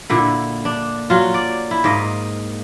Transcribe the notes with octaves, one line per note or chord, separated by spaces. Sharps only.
A#2 D3 E4
D4
F#3 F4
D5
E4
G#2 A#3 D#5